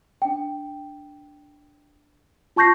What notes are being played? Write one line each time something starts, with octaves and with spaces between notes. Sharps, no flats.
D4 G5
F4 A5 C#6 G6 A#6 C7